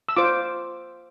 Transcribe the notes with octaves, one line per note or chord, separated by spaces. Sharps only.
E6
F4 C5 D6